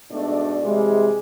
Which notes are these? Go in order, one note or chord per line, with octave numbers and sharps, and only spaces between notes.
G#2 B2 A3 D4 D5
C3 E3 G3 G#3